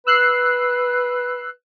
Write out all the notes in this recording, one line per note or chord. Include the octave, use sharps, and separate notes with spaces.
B4 E6 F#6 C7